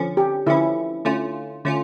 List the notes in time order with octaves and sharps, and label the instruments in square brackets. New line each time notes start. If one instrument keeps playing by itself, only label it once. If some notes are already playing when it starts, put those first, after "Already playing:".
Already playing: [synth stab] D3 F3 C#4
[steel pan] G4
[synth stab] D3 F3 C#4 [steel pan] E4
[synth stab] D3 A3 C#4 F4
D3 A3 C#4 F4